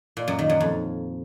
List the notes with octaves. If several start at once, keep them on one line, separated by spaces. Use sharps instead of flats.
A#2
F#2
D#3
F#2
F2